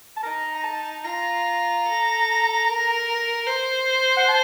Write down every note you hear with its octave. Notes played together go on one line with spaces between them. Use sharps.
A5
D#4 A#5
A#5
A5
F4 A#5
A4
A#4
C5
F#5
A5